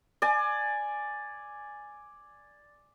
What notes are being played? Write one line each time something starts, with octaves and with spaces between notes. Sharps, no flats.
D5 G#5